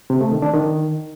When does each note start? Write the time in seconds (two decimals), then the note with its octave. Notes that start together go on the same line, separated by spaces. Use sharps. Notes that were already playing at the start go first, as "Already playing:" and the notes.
0.10 C3
0.21 A3
0.32 D#3
0.42 D4
0.53 D#3